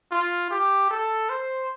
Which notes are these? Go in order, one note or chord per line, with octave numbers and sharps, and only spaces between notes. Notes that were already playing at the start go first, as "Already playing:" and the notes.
F4
G4
A4
C5